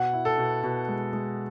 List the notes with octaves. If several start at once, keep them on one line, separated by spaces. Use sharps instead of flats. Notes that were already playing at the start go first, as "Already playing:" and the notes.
Already playing: B2 F#5
E4
A4
B2
B2
G#3
G#3